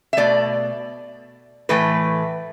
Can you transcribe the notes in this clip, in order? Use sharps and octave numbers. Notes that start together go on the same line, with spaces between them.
E5
B2 A3 D5
A2 E3 A3 B4